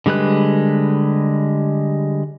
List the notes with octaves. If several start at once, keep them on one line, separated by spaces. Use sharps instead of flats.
D3 G3 G#3 B4 F#6